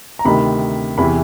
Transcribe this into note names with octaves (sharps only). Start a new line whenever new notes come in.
A#5
D2 C3 D#3 B5
E2 C3 E3 B5